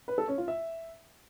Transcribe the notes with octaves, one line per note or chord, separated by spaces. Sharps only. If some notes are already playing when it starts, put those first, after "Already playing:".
B4
A4
C#4
F4
E5